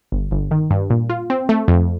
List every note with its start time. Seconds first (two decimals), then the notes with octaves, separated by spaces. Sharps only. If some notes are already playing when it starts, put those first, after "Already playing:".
0.12 G1
0.31 G1
0.51 D#3
0.71 G2
0.90 A#2
1.10 F4
1.30 C4
1.49 A3
1.68 F2